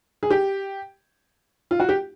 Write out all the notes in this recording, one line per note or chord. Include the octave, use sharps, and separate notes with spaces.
G#4
G4
F4
F#4
G4